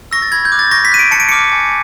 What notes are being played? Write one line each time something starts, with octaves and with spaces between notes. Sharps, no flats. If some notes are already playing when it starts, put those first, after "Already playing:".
C#6 E6 A#6
A6
B5 G#6
G6
D6 F#6
A6
C#6 A#6
B6
F#6 D#7
D7
A5 C#7
D7
D6 F6 C#7
G#5